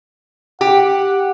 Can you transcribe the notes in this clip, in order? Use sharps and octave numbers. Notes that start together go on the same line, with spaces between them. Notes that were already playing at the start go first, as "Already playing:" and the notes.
G4 F#5